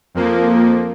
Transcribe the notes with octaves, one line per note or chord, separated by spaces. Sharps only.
F2 F3 A#3